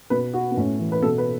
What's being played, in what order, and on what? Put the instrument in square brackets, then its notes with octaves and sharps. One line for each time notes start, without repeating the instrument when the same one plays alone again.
[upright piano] B2 B4
F#4
B3
A2 C#4
E3
B4
B2 A4
B4